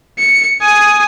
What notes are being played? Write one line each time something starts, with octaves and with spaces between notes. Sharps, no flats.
C#7
G#5 D#6